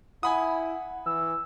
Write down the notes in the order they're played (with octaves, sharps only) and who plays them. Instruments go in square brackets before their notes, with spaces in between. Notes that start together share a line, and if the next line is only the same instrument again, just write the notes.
[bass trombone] E4 [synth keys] F#5 [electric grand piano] G#5 B5 D#6
[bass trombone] E3 [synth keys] E6